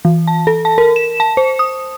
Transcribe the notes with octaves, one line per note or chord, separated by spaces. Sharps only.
E3
A5
A4
A5
A#4
E7
A5
C5
D#6